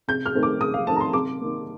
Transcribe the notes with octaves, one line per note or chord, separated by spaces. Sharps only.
C3 G6
F6
D#3 A3 C4
D6
C3 D#6
F5
D#3 A3 C4 A5
A#5
C6
C3 D6
D#3 A#3